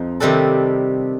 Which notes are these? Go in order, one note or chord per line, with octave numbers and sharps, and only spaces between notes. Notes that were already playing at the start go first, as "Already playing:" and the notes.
Already playing: F2 F3 D#4
C3 D#3 G3 D4 A4